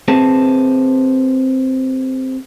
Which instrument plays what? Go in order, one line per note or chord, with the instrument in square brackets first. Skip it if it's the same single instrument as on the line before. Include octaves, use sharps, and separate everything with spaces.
[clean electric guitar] C4 G#4 B4 C5 A5